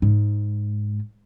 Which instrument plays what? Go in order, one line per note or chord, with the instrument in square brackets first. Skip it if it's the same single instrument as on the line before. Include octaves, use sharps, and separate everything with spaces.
[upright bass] G#2